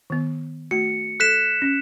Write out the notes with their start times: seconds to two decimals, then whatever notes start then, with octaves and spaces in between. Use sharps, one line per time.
0.10 D#3 B3
0.71 A3 F#4 C#7
1.20 A4 F#6 B6 E7
1.62 C#4